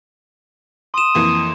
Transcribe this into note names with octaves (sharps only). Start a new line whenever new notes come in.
C6 D#6 E7
F2 E3 A#3